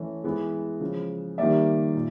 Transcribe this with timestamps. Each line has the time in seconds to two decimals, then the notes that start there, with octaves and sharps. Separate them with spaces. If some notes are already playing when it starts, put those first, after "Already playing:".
Already playing: E3 A3 C#4
0.24 E3 G#3 B3
0.80 C#3 F3 G#3
1.38 D#3 G3 A#3 D5 E5
1.95 A#2